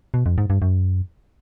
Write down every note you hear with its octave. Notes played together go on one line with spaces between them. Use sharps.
B2
F2
G#2
G2
F#2